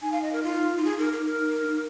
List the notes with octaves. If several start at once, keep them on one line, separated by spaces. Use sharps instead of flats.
D#4 G#5
F5
D#5
A#4
F4
F4
G#4
A#4
A#4
A#4
D#4